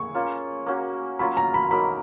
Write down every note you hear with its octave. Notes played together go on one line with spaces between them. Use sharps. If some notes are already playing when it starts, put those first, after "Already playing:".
Already playing: G#4 C#6
A#3 C#4 F4
A#3 C#4 F#4
F#3 A#3 C#4 F4 B5
A#5
B5
F#3 A#3 D#4 A#4 B5